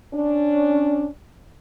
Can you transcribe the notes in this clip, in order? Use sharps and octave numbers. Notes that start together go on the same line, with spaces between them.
C#4 D4